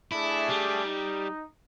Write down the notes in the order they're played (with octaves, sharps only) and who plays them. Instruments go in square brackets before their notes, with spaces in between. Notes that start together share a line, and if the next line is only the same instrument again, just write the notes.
[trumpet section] A3 D4 G#4 [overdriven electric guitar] E4
[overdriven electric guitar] G3
[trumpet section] D#4